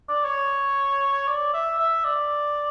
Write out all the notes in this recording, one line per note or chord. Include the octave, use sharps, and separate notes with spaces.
D5
C#5
D5
E5
E5
D5